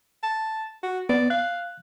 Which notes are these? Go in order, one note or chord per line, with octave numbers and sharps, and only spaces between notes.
A5
F#4
B3 D5
F5 F#6